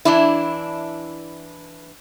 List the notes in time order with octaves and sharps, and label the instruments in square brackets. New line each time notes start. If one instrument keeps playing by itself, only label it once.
[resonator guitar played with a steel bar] E3 D4 E4